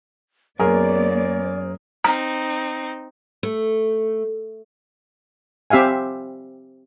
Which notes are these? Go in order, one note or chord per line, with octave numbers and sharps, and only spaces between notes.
F#2 A#3 B3 G#4 A#4 C#5 D5
C4 D#4 A#5
A3
C4 G4 E5 F5 G#5